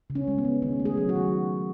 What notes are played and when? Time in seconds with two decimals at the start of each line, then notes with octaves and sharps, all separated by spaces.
0.10 C#3
0.15 C#4
0.28 G#3
0.38 B3
0.45 G#3
0.62 D#3 C#4
0.80 A3
0.85 G#4
0.97 F#3
1.09 F#4
1.15 D#3